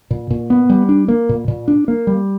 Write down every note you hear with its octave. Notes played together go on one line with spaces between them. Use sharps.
A#2
A#2
B3
G3
D4
A#3
A#2
A#2
D4
A#3
G3